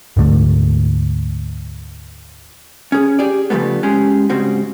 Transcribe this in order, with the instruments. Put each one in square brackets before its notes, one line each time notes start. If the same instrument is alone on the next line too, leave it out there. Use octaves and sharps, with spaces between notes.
[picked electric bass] D2 G#2 D3 A3
[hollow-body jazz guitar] C#4 G#4
G4 G#4 D5
C#3 F3 G3 A3 B3
G#3 C#4 G4 G#4
G#2 C#3 G3 C4 F#4